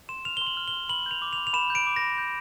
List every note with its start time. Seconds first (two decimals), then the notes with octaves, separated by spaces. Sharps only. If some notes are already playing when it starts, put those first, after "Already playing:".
0.09 C6 E7
0.25 F6 F7
0.37 G7
0.42 C6
0.47 F#7
0.57 F6
0.68 G7
0.73 C6
0.89 B5 F#7
1.06 G6 F7
1.22 D6
1.33 F7
1.38 B5
1.47 F7
1.53 B5 E7
1.70 G6
1.75 D7
1.87 D6
1.96 A#6
2.02 B5
2.18 G6